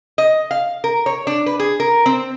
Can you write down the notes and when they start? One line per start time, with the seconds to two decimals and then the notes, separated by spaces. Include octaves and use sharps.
0.18 D#5
0.51 F5
0.84 A#4
1.06 C#5
1.27 D4
1.46 B4
1.59 G#4
1.80 A#4
2.06 C4